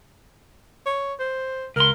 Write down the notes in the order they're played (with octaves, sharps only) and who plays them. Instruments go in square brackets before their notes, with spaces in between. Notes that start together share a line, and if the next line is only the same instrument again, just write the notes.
[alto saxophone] C#5
C5
[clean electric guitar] C#2 C6 [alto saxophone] A#4